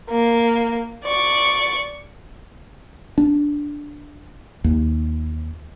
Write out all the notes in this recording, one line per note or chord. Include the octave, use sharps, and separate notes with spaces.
A#3
D5 C#6
D4
D#2